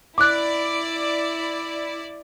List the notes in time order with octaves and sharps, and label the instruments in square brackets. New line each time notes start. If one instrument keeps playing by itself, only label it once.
[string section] E4 D5 [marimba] D6 F#6